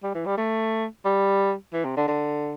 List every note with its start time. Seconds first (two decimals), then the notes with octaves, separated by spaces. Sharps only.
0.04 G3
0.15 E3
0.26 G3
0.38 A3
1.05 G3
1.74 E3
1.85 C3
1.97 D3
2.08 D3